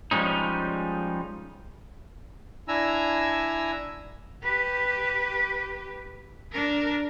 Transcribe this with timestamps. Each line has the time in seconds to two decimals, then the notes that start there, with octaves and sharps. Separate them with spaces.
0.11 F3 G3 G#3 C#4 D#4
2.68 D4 E4 G#5 A#5 E6
4.43 G4 B4
6.52 D4 A#4